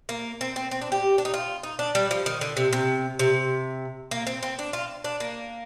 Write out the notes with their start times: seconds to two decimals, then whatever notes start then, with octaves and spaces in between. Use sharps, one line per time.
0.09 A#3
0.41 C4
0.56 C4
0.71 C4
0.81 D4
0.92 G4
1.18 D4
1.25 D#4
1.34 F4
1.63 D#4
1.79 D4
1.95 G3
2.11 F3
2.26 D#3
2.41 D3
2.57 C3
2.73 C3
3.19 C3
4.11 A#3
4.27 C4
4.43 C4
4.59 D4
4.73 F4
5.04 D4
5.20 A#3